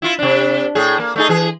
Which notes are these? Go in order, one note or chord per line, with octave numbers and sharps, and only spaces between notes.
E4 F4
C3 D4
A2 G#4
A#3
A3 D#4 G#4
E3 G#4